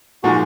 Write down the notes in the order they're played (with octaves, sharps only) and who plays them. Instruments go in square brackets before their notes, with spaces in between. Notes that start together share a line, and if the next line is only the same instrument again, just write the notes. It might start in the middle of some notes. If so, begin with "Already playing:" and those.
[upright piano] A#2 F3 G#3 D#4 [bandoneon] F#4